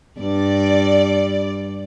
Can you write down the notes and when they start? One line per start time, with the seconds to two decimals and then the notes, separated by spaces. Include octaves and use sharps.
0.20 G2 D5